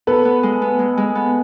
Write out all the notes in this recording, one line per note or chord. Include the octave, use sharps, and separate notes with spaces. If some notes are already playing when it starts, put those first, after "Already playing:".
B3 A4 B4
B3
G#3
B3
G#3
G#3
B3